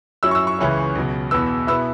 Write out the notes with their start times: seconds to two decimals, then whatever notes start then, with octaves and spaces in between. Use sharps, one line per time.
0.23 F#2 F#3 C#4 E4 E6
0.31 C#6
0.35 E6
0.47 C#6
0.59 C#2 C#3 E3 C#4 E4
0.95 C#2 B2 F#3
1.31 E2 B2 B3 E6
1.67 B2 B3 E4 E6